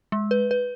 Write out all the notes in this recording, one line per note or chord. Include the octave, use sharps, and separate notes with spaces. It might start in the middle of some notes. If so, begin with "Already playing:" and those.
G#3
B4
B4